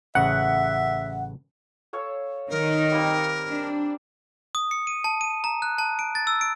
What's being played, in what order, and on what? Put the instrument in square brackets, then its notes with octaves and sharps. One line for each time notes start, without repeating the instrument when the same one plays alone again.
[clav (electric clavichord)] A1 C#3 [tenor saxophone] E5 [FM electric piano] F#5
[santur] A4 C#5 F5
[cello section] D#3 D#4 [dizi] A#4
[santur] G3 A#3 C4
[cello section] D4
[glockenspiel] D#6
C#7
D#7
A5
D#7
A#5
F#6
A5
D7
A6
E6
D7